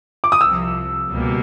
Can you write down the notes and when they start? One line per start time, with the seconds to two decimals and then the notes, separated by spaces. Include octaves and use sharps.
0.24 D6
0.32 D#6
0.41 C2 C3 F3 E6
1.09 C#2 B2 G3 A#3